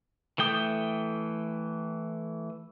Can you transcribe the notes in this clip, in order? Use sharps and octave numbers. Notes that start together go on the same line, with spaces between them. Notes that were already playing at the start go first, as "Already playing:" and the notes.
E3 A3 G5 D#6